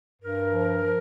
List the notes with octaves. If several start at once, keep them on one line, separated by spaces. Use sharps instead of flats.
G2 A#4
F3
F3